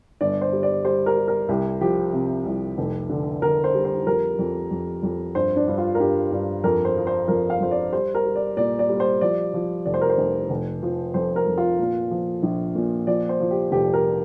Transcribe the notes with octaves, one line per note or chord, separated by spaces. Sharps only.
G1 D5
C5
G3
D5
G3 C5
A#4
G3
A#4
C2 G4
F3 G4
C3
C2
F1
D3
D3 A#4
C5
G3
C5
F2 A#4
F2
F2
F2
G2 C5
D4
G2
F4
A#4
G2 G4
G2
F2 A#4
C5
F3
C5
F2 A#4
F5
F2 C5
D5
G3 C5
A#4
G3
D5
A#2 D5
D5
G3
C5
F3 D5
F3
F1 D5
C5
A#4
C5
F1
F1
F3
F2 C5
A#4
F2
F4
A#2
F3
A#1
A#2
F3 D5
C5
F3
G4
F1 G4
A#4